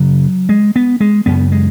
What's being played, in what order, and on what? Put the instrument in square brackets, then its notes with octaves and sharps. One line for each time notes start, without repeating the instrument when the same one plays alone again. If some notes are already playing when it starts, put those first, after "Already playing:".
Already playing: [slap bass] F#2 C#3 F#3
G#3
B3
G#3
F#2 C#3 B3
G#3